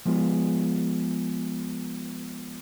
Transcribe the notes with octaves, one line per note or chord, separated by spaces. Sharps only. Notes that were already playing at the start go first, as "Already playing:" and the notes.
F3 G#3 B3 F4 G#4